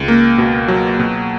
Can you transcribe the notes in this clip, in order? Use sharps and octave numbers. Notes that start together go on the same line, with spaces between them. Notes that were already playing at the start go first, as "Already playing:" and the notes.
Already playing: C#2
A#3
B2
F#3
B2